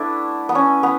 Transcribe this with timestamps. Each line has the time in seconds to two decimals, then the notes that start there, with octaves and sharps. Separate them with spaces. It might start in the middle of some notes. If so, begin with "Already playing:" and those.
Already playing: A3 B3 D4 E4
0.49 B3
0.55 C#4
0.83 B3